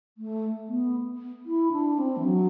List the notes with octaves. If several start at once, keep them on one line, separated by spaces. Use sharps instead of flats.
A3
B3
E4
D4
C4
E3
F#3